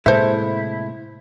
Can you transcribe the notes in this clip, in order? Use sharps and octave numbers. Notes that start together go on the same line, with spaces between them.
A2 C3 G#3 A#3 E4 A4 C5 E5